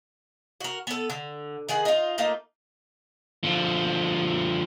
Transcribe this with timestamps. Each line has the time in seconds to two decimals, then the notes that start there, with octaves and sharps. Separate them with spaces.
0.61 F#4 A#4
0.87 B3 A4
1.10 D3
1.68 D#3 G#4 F#5
1.85 D#4 F4
2.18 A3 A#3 D#4 F4
3.44 D3 F3